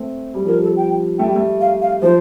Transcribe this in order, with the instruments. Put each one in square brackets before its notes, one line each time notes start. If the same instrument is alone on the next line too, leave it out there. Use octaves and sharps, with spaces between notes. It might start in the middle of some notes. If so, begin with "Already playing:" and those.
Already playing: [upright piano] A3 C4
G3
[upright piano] F3 [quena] A#4
[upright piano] G3
[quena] A4
G5
[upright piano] A3 [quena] G5
[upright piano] G3
A3
[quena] F5
F5
[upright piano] F3 [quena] C5